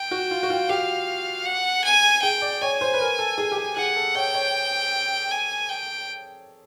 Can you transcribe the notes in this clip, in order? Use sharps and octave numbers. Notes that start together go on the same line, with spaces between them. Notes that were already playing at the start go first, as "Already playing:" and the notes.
Already playing: G5
F#4
F4
F#4
F4
G4 F5
F#5
G#5
G#4 G5
D5
C#5 G#5
C5
B4
A#4
A4
G#4
G4
G#4
G#4 F#5
A4
C#5 G5
C#5
G#5
G5